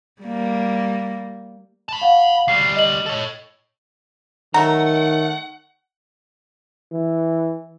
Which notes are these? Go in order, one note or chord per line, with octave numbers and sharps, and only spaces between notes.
G3 A#3
A5 B5
F5 F#5
D2 G3 C7
D#5 F#7
A4 C#5
D#3 F#3 A3 F#5 A#5
E3